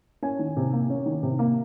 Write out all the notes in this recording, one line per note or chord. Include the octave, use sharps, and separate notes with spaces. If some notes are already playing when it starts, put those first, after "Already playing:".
C#4 G#5
D#3
C3
A#3
C#4
D#3
C3
A#3